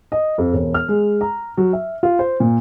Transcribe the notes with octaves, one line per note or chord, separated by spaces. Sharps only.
D#5
F2
E1
F6
G#3
A#5
F#3
E5
F4
C5
A#2